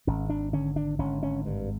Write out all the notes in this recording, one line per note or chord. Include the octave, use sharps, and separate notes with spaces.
G#1 C#4
D4
D3 C#4
D4
G#1 C#4
C#4
G2